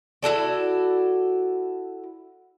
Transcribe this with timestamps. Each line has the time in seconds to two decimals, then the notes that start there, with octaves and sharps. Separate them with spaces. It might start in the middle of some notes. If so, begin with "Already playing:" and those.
0.23 E4 F#4 A4 D5